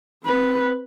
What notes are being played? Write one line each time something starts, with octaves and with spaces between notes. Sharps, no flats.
C4 B4